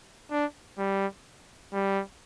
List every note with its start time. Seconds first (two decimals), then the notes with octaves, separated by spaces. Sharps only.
0.31 D4
0.78 G3
1.73 G3